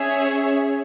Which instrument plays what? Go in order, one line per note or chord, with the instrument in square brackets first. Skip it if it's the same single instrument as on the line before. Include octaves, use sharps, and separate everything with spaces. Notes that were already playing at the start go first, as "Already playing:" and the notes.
Already playing: [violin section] C#4 G#4 C#5 E5